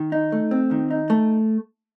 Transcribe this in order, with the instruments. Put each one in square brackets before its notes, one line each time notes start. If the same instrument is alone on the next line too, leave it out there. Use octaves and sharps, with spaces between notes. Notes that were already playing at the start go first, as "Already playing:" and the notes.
Already playing: [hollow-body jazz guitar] D#3
D#4
A3
C4
D#3
D#4
A3